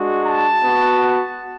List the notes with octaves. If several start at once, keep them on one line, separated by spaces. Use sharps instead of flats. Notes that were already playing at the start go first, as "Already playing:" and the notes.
Already playing: G#3 D4 F#4
A5
B3 F#4